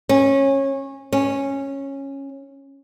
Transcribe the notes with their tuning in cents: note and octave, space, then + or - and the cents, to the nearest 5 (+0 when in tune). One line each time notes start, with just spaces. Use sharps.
C#4 -20
C#4 -10